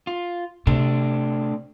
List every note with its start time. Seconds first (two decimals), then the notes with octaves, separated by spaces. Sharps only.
0.07 F4
0.67 C3 A3 C4 D4